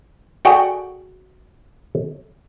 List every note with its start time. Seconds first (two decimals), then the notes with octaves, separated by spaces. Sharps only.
0.45 F#4 G#4 A4 D5 F#5 G5